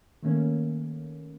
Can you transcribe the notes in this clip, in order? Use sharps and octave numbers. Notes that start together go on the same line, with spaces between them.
D#3 A3 A#3 C#4